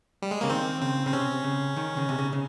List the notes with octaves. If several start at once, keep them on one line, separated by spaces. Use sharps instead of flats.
G3
G#3
C#3 A#3
D#3 C4
C#3 C4
C#3 C4
C3 C#4
C#3
D#3
C#3
C3
C#3
C#3